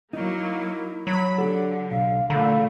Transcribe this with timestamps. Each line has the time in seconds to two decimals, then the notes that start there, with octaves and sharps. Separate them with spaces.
0.13 F#3 A#3 D#4 E4
1.07 F#3 B5
1.38 D3 D4 G4 A4 F#5
1.91 B1 F5
2.30 A#2 D3 E3 A3 F5 A#5 B5